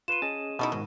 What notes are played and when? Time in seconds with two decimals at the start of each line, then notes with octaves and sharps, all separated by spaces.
0.08 F4 B4 C6 D#7 E7
0.22 C#4 G#4 D#5 A5
0.59 B2 A3 D#4 E4
0.72 G#2 D#3 F#3